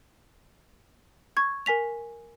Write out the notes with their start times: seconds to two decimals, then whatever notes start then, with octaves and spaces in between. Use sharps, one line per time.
1.37 C#6 G#6
1.66 A#4 G#5 B6 F7